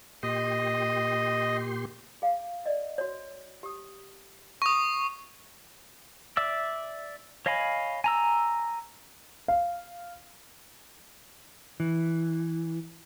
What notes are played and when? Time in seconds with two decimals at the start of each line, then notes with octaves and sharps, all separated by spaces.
0.23 A#2 G4 D#5 C6
2.22 G#4 F5
2.66 D5 D#5
2.98 F#4 C#5
3.63 G4 D#6
4.62 C#6 D#6
6.37 D5 E5 D6 E6
7.46 C#5 D#5 F5 G#5 B5
8.04 G#5 A#5 E6
9.48 F5
11.80 E3